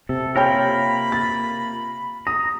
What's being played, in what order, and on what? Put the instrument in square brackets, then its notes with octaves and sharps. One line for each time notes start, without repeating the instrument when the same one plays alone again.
[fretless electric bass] C3 [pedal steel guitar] A4
[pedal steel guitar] A#3 F4 A#4 [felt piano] C#5 G5 G6 [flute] B5
[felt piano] A6
[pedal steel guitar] A#5 [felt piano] D#6